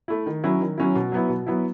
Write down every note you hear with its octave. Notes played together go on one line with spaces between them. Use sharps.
A3 E4
D#3
F#3 C#4 E4
D#3
F#3 C#4 E4
B2
F#3 B3 E4
B2
F#3 B3 E4